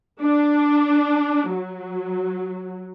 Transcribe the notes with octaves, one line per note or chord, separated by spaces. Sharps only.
D4
F#3